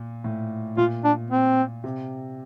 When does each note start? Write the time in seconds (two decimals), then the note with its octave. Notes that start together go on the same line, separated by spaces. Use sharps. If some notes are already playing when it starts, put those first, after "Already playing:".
Already playing: A#2
0.24 A2
0.77 A#2 F4
1.04 D4
1.30 C4
1.84 C3